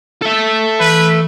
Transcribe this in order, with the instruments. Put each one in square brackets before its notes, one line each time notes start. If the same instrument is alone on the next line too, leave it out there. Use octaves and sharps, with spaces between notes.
[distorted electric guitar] A4 E5
[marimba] E3 [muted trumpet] B4